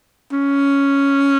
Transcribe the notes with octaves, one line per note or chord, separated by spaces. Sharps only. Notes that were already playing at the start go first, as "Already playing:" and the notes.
C#4